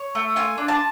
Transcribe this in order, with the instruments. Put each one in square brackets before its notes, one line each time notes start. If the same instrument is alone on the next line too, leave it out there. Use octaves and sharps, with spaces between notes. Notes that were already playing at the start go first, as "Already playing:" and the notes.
Already playing: [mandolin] C#5
A3
F4 G#5
D4
A5